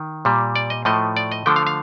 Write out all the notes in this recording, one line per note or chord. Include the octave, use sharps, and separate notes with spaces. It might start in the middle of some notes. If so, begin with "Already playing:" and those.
Already playing: D#3
A#2 G3
D5
D#5
A2 F3 A3 D#5
D5
D#5
D3 F3 A3 G5
F5
F5